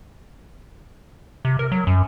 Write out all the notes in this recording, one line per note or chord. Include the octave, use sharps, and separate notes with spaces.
C3
A#4
F#3
F#2